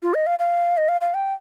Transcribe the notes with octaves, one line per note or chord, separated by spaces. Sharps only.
F4
D#5
F5
F5
D#5
F5
F5
G5